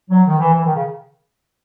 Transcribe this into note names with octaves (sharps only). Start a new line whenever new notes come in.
F#3
D#3
E3
E3
D#3
C#3